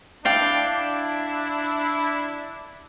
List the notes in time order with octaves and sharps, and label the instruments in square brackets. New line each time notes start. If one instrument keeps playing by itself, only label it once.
[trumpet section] D4 E4 [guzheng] D5 F5 G5